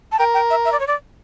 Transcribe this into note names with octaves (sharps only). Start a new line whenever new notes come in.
A5
A#4 G5
G5
E5
E5
D5
C#5
D5